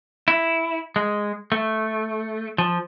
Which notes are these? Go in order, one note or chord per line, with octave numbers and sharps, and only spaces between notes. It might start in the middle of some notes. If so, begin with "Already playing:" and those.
E4
G#3
A3
F3